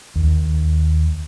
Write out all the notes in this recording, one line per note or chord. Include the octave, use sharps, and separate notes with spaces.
D#2